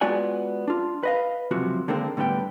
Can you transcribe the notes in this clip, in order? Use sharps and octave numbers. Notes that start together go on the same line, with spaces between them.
G#3 B3 F4 F#4 D5 G#5
D4 F4
B4 D#5 F5
C#2 F#2 C3 F3 F#4
D3 D#3 G#3 A#3 C4
A2 D3 G3 B3 G5